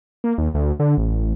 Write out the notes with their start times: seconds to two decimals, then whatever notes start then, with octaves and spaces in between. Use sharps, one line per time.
0.24 A#3
0.38 D#2
0.54 D2
0.80 D3
0.98 A1